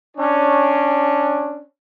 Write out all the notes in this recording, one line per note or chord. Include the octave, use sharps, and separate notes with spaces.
C#4 D4